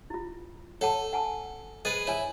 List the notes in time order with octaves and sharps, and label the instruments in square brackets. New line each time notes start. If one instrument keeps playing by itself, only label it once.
[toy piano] E4 F4
[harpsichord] A4 [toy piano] C#5 F#5 A5
[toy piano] F#5 G#5 A5
[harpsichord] G#4 B4 [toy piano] C5 D#5
[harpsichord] E4 [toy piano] C#5 G#5